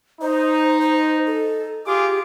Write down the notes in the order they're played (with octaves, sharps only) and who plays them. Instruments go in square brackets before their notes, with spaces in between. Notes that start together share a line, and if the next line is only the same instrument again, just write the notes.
[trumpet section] D#4 [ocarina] C5
[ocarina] C5
A4
[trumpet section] F4 G#4 D6 [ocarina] G4